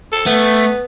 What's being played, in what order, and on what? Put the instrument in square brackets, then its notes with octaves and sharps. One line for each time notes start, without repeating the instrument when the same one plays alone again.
[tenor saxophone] A4
[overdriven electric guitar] A3 [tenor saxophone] B3